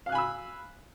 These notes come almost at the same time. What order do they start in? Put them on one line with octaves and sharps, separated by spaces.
F5 F#6 G#5 B5 E6